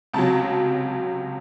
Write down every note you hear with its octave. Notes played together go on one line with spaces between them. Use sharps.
C#2 C3 F#3 A5